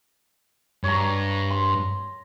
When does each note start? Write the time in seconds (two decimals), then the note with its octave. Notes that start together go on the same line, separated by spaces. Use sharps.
0.84 G2 C#5 A#5
1.51 C6